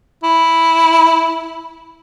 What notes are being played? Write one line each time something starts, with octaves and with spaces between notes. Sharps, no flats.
E4